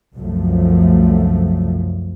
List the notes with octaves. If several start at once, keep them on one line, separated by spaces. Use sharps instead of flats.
C2 F#2 F3 A3